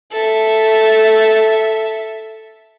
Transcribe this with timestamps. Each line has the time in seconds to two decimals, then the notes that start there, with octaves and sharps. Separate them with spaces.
0.12 A4 E5